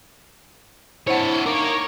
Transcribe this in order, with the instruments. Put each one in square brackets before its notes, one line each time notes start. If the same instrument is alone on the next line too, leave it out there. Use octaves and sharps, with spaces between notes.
[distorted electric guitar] D4 C#5 [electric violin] E4 A5 [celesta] C5 F#5
[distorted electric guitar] A#3 A#4 [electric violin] D#4 C#5 [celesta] D6 D7